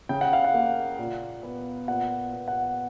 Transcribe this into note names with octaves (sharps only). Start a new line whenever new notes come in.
C#3 G5
F#5
F5
F#5
A#3
A#2
B3
A#2 F#5
B3
F#5